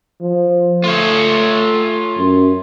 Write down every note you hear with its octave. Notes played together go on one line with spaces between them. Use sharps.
F3
A3 F4 C#5
F#2